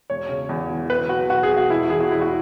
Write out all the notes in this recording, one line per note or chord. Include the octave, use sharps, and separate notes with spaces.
E1 C#5
C#3
E2
E3
B1 B4
B1 F#4
B2 F#4
G#4
B2
F#4
E1 E4
E3 G#4
F#4
E2 E4
F#4